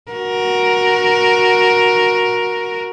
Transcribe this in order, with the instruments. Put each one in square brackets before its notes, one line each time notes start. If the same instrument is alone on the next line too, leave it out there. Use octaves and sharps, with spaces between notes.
[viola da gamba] F#4 A#4